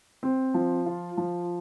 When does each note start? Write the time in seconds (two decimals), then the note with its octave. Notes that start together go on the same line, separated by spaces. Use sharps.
0.23 C4
0.54 F3
0.86 F4
1.17 F3